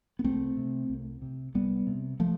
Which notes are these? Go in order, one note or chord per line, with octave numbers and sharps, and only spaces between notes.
B3
C2 A3 C4
C3
C2
C3
C2 G3 B3
C3
F3 A3